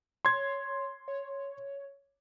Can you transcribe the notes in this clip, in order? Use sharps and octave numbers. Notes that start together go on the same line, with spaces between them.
C#5 C6 G#6
C#5